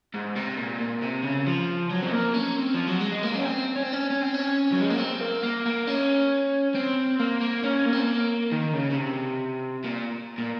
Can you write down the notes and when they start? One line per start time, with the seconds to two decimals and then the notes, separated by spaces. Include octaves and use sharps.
0.14 G#2
0.36 C3
0.57 A#2
0.80 A#2
1.02 C3
1.23 C#3
1.47 F3
1.90 F#3
2.03 C4
2.12 A#3
2.34 C#4
2.56 C4
2.74 F3
2.87 F#3
3.01 G#3
3.11 G#3
3.23 A#3
3.35 C#4
3.45 C4
3.76 C#4
3.83 C4
3.93 C#4
4.11 C#4
4.22 C4
4.34 C#4
4.73 F#3
4.81 G#3
4.90 A#3
4.98 C4
5.21 A#3
5.43 A#3
5.65 A#3
5.87 C#4
6.75 C4
7.20 A#3
7.41 A#3
7.63 C#4
7.86 A#3
7.93 C4
8.01 A#3
8.52 D#3
8.73 C#3
8.91 C#3
8.96 C3
9.84 A#2
10.38 A#2